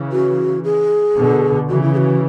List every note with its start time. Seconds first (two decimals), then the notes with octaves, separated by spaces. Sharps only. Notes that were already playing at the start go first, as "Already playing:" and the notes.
Already playing: C#3 E3
0.12 F#4
0.64 G#4
1.17 B2 D3
1.69 C#3 E3 F#4
1.82 E4
1.94 G#4
1.97 F#4